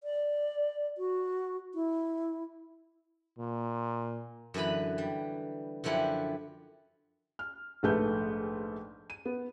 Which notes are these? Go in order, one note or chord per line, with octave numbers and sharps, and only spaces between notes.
D5
F#4
E4
A#2
F#2 D3 E3 B4 B5
G3
F#2 D3 F3 E4 G4 F#5
F6
A#1 G#2 A3 B4 G6
D#7
B3